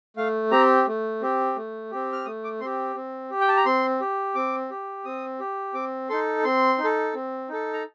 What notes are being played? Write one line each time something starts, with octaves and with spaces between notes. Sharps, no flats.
A3 F5
C4 G4 A#5
A3
C4 G4
A3
C4 G4
F6
A3 D#6
D6
C4 G4 C6
C4
G4
G5
A5
A#5
C4 C6
G4
C4 D6
G4
C4 D#6
G4
C4 D6
D#4 A4 C6
C4 C6
D#4
A4
C4
D#4 A4
A#5